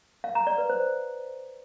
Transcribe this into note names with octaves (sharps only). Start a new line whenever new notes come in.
F5
A#5
D5
B4
C5